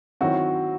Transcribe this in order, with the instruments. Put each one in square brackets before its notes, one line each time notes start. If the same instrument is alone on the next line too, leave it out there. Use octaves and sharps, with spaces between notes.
[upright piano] D#3 F#3 C4 E4 [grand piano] F#4